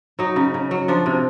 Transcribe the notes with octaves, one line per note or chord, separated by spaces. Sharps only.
F#3 D#4
C#3
C#3
F#3
F3 D4
C3